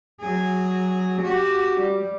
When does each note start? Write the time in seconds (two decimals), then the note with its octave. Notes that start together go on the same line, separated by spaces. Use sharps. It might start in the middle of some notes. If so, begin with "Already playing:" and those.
0.21 F#3 G#4
1.22 F#4 G4
1.81 G3